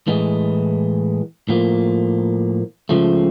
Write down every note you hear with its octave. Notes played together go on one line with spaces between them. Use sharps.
A2 E3 G#3
A2 F3 A#3
C#2 C#3 F3 A3